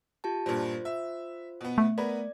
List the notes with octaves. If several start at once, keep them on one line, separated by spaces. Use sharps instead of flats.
F4 G4 A5
G2 A#2 F4 C5
E5
B2 B3
A3
B3 A#4 B4 D5